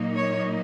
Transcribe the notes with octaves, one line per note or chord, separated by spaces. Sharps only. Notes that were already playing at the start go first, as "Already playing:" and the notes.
Already playing: A#2 F#3 A#3 D#4
C#5